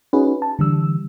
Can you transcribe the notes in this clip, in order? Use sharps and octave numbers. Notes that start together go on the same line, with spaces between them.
C#4 D#4 F#4 G#4 B4
A5
D3 E3 G3 E6